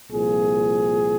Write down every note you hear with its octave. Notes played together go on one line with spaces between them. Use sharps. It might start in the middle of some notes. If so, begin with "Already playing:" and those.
C2 A#2 F3 G#4